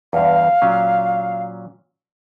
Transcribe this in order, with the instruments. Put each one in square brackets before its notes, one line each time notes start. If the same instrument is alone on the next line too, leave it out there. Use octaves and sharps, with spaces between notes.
[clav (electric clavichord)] E2 G2 [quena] F5
[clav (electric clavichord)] A#2 F#3 C#4